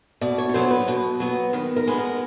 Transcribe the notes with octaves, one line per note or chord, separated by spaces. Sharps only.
B2 D5
C#5
C#5
F#3 B3 C5
B4
B2
F#3 B3
D#3 B4
A#4
G#3 B3 B4
A#4